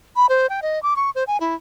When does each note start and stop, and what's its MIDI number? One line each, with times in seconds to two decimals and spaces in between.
0.16 0.26 83
0.29 0.47 72
0.50 0.60 79
0.62 0.82 75
0.83 0.94 86
0.96 1.10 85
1.15 1.24 72
1.27 1.37 80
1.41 1.55 64